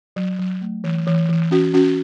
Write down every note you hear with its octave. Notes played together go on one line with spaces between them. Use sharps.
F#3
F#3
A3
E3
E3
E3
C#4 F#4
C#4 F#4